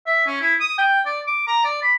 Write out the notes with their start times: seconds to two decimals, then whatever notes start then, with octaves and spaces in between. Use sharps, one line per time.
0.07 E5
0.27 C#4
0.41 E4
0.60 D#6
0.78 G5
1.06 D5
1.28 D6
1.47 A#5
1.64 D5
1.82 B5